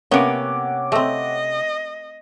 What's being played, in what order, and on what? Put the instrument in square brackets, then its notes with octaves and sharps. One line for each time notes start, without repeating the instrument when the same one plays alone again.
[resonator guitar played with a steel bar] C3 C#4 [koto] A#3 B3 [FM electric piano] C#5 F#5 D6
[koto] A3 C4 [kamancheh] D#5